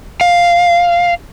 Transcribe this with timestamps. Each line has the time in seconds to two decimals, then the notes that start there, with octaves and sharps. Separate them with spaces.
0.21 F5